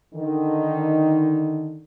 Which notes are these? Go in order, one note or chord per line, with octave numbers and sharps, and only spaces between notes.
D3 D#3